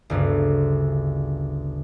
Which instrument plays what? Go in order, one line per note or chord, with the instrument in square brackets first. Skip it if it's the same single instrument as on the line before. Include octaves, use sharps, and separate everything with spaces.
[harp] G1 D2 G2 C#3